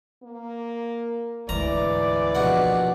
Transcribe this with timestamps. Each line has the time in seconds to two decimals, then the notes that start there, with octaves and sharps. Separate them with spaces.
0.23 A#3
1.49 D2 G#2 E3 D5 A#5
2.35 A#1 B2 F#5